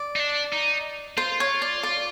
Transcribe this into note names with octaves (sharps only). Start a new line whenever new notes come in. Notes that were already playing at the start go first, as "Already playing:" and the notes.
Already playing: D5
D#4
D4
D#4
F4 C5
C#5
D5
D5